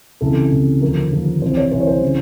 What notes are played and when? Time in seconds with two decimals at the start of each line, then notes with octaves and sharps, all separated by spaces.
0.21 C#2 C3 E3 A4
0.52 C#2 C3 E3
0.82 D#2 D3 F3 A#4
1.12 D#2 D3 F3
1.42 C2 C3 E3 C5
1.57 C#5
1.72 C2 C3 E3 C5
1.80 C#5
1.87 C5
2.02 C#3 E3